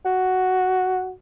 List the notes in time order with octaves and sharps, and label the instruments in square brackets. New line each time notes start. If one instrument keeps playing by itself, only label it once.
[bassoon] F#4